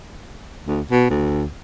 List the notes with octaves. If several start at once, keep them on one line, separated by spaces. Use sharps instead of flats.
D2
B2
D2